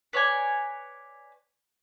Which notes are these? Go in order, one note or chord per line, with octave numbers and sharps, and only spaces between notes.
B4 C#5 D5 G#5